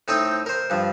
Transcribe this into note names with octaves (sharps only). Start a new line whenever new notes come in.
A2 C4 D#4 D#5 G5
A#4 C5
G2 F3